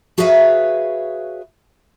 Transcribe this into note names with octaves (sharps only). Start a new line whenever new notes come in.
F#4 G#4 B4 C#5 E5 F5